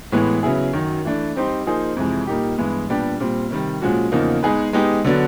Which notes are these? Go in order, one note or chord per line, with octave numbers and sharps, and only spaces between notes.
A2 E3 G#3 B3
C#3 F#3 B3 E4 G#4
F#2 D#3 F#3
E3 A3 D4
G3 C4 D#4 G4 C5
F3 A#3 D#4 G#4 C5
F2 C3 E3 G#3
A#2 G3 A#3 D#4 G4
G2 E3 G#3 B3
A#2 G3 B3 D4 G4
A#2 G3 C4
C3 D#3 G3
A#2 F3 G#3 C#4 F#4
E2 C#3 F3 A#3 D#4
G#3 B3 D#4 G#4 B4
G#3 B3 D#4 G4
D3 F#3 B3 D4